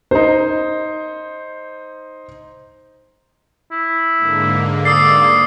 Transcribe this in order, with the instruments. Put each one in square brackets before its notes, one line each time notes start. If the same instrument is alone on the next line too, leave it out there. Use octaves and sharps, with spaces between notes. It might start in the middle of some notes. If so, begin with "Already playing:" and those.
[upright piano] D#4 C5
[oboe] E4
[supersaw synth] G#2 D3 A#3
[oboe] D5 [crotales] D#6 E6 C7